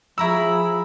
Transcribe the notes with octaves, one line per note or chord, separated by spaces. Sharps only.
F3 E4 G#4 A#5 B5 C#6 E6